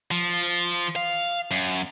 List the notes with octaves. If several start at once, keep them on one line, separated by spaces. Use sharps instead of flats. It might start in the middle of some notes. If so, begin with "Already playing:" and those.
F3
F5
F#2